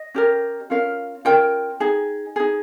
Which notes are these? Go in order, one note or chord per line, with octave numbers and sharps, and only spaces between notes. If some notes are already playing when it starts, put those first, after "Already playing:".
Already playing: D#5
C#4 G4 A#4
C#4 F4 A#4 F5
C#4 F4 A#4 G5
D#4 G#4
D#4 G#4